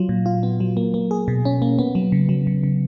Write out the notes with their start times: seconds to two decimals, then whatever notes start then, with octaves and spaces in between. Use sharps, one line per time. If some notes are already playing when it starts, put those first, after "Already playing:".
Already playing: F#3 F4
0.09 A#2
0.26 F4
0.43 B3
0.60 F#3
0.77 A#3
0.94 A#3
1.11 G#4
1.28 B2
1.45 C#4
1.62 A#3
1.79 B3
1.95 F#3
2.12 C#3
2.29 F#3
2.47 C#3
2.63 C#3